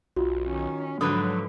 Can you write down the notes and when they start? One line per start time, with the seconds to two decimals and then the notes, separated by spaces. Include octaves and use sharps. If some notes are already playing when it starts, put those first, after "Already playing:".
0.16 B1 F4 F#4
0.46 D#3 C#4
1.01 G#2 D3 F3 F#3 D4 B4 D#6 F#6